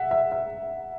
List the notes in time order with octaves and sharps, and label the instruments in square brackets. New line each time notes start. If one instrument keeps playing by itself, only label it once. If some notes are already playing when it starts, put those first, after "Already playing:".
Already playing: [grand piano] E5 F#5
E5
E5